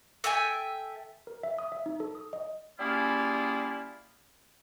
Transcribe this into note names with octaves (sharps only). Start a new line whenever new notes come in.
A4 E5 G5 G#5
A#4
E5
D#6
E5
D#4
A4
D#6
D#5
G3 A#3 C#4 E4 F4 G#4